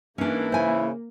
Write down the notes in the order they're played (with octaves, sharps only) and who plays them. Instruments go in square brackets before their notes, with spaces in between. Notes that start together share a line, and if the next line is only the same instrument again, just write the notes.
[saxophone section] G#2 E3 [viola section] A#3 [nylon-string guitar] C#4 D4
[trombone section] C#3 E4 [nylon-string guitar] C5 G#5